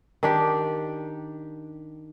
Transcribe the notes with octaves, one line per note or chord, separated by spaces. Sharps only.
D#3 D4 G4